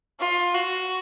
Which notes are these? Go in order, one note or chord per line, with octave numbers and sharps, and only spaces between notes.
F4
F#4